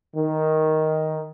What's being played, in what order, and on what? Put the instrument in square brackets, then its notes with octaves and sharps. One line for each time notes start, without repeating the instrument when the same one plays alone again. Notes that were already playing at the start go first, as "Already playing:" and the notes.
[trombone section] D#3